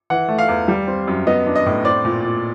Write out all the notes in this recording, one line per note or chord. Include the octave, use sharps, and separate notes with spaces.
E3 F#5
A3
F5
E2
G3
C4
F#2
B3 D#5
D4
D#5
A2
C4 D5
A#2
A#2